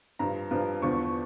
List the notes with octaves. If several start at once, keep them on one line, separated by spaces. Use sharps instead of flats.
G2 F3 A#5
G2 F3
E2 D3 F3 C#6